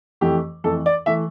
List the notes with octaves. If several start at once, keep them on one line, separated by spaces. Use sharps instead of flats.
F2 E3 A3 G4
F2 E3 A3 A4
D5
E3 A3 E5